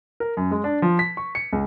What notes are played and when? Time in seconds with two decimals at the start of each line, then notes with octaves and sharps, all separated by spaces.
0.20 A#4
0.37 F#2
0.51 G#3
0.64 D4
0.82 F3
0.99 B6
1.17 C#6
1.35 C#7
1.53 C#2